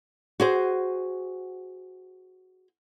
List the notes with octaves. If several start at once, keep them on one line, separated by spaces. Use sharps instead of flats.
F#4 G#4 C5